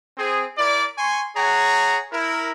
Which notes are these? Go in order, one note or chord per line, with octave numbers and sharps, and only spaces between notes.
C4 G#4
E4 A#4 D5
G#5 C6 C#6
G#4 C#5 F#5 A#5
E4 A#4